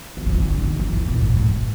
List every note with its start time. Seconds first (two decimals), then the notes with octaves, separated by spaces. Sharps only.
0.17 F#3
0.26 F3
0.34 E3
0.42 D#3
0.50 D3
0.64 D#3
0.79 E3
0.93 E3
1.08 A#2
1.22 A2
1.37 G#2